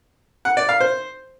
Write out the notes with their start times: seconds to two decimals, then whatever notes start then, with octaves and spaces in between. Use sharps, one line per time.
0.45 F#5
0.57 D5
0.69 F5
0.80 C5